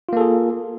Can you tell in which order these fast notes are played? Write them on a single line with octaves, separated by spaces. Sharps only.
F4 A#3 A4 G#4